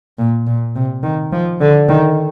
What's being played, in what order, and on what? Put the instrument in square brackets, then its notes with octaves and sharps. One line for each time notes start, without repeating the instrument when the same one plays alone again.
[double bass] A#2
A#2
C3
D#3
F3
D3
D#3